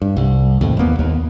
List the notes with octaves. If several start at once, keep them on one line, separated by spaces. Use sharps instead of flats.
G2
C2
D#2 A2 C3
F1 E2 A#3 B3
D#2